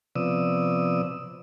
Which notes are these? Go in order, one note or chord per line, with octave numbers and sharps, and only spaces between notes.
C3 F3 B3 D5 D#6 E6